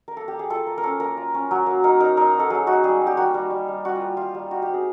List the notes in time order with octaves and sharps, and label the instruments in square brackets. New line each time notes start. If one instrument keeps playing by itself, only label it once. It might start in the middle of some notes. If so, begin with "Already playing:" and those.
[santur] A#4
A#3 A4
G4
A#3
G#4
F4 A4
A#3
A#4
C#4 A4
A#3 A#4
F4
C#4
F#3
A#3
D#4 A#4
D#4 A#4
D#4 A#4
D#4
A4
F#3 G#4
D#4 F#4
G3 G#4
G3
G4
A#3 F#4
G3
G3
G3
G3 F#4
F4
A#3
G3 F4
G3
D#4 F#4
G4
C4
G#4